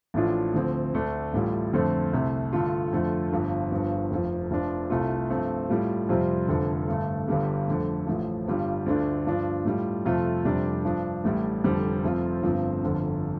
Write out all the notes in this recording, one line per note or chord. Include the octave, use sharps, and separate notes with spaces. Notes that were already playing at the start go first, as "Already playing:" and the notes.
A1 A2 F3 D4 F4
D2 D3 F3 C4
D2 D3 A3 D4
A1 A2 G3 F4
F2 D3 A3 C4
C2 C3 A3
G2 D3 A3 F4
F2 D3 A3 F4
G1 G2 F3
G1 G2 F3
F1 F2 F3
F1 F2 F3 D4 F4
C2 C3 A3 F4
G2 F3 A3 C4
A2 G3 F4
F2 C3 G3 C4 F4
F1 F2 D3
G2 D3 A3
G1 G2 D3 G3
F2 D3 A3
A1 A2 F3
G1 G2 G3 F4
D2 D3 A3 D4 F4
G2 F3 D4 F4
A2 G3 F4
F2 C3 A3 F4
F1 F2 C3 G3 D4
G2 F3 D4
A1 A2 G3
F1 F2 D3 G3
F1 F2 F3 C4 F4
G1 G2 F3 C4
G1 F2 D3